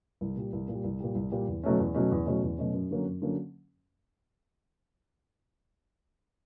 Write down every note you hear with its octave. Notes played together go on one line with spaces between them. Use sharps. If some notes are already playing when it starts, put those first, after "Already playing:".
C2
A#2 G3
C2
A#2
G3
C2
A#2 G3
C2
A#2 G3
E2
B2 F#3 A3 C#4
E2
B2 F#3 A3 C#4
E2
B2 F#3 A3 C#4
E2
B2 F#3 A3 C#4
F#2
D3 F#3 A#3 C#4
F#2
D3 F#3 A#3 C#4